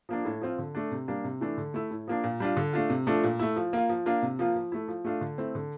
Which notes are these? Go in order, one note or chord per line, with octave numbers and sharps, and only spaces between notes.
F3 A#3 D4
A2
F3 C4 F4
D3
A3 D4
C3
G3 A#3 D4
C3
E3 A3 D4
D3
A3 E4
A2
F3 A#3 D4
A#2
G3 D4 F4
D3
A3 D4 F4
C3
F3 A3 D4
A#2
A3 E4
F3
A#3 F4
F3
A#3 D4 F4
C3
F3 A#3 F4
F3
A3 E4
F3
A3 D4 F4
D3
A3 C4 E4
D3